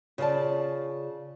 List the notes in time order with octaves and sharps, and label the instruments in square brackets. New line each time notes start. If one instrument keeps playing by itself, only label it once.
[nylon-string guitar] C#3 F4 G#4 D5 A5